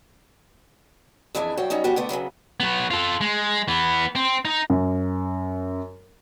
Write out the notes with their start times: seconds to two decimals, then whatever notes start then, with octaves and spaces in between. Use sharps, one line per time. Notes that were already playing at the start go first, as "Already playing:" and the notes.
1.35 F2 E3 D4 E4 G#4 E5
1.57 G2 F#3 F#4 C5 G5
1.70 F#3 G3 C#4 D#4
1.84 F3 G3 B3 C#4 F#4 G4
1.96 D3 A3 B3
2.09 C#3 F3 F#3 B3
2.60 F#3 B3
2.91 F4 A4
3.21 G#3
3.68 E3 B3
4.15 C4
4.45 D#4
4.70 F#2